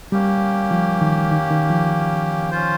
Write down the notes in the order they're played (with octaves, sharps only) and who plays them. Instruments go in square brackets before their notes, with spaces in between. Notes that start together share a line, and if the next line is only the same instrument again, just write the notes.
[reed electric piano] G3 [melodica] A#3 C#4 G4
[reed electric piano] F3
D#3
D#3
D#3
F3
[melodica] C#4 F4 C5